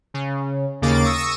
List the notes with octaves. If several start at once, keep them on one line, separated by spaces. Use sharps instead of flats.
C#3
D#2 C#3 A#3 D6 A6
C#6 D#6 E6 A#6